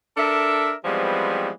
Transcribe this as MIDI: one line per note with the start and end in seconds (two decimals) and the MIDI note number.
0.17 0.73 62
0.17 0.73 69
0.17 0.73 70
0.17 0.73 76
0.85 1.51 52
0.85 1.51 53
0.85 1.51 55
0.85 1.51 56
0.85 1.51 59
0.85 1.51 60